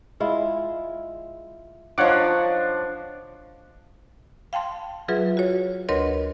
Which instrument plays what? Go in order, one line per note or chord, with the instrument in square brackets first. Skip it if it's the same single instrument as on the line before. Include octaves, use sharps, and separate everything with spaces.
[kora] G#3 E4 F4
[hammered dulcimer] F3 D4 [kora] D#4 F4 [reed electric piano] C#5 F#5 D6
[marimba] F5 G5 A5 C6
F#3 F4 G#4 B4 E5
F#4 C#5
D2 A#4 B4 C#5 D#5 C6